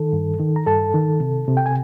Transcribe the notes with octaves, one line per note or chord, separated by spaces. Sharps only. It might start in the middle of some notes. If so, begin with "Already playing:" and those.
Already playing: D#3 A4
G2
D#3
A#5
G2 A4 A5
D#3
C3
C3
G5
G#5